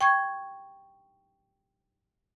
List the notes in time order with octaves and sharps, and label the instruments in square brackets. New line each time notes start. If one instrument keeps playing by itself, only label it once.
[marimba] G5 C#6 G#6